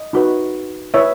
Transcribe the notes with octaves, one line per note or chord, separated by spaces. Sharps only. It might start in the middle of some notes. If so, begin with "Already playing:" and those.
Already playing: D#5
D#4 F#4 B4
E4 B4 C#5 E5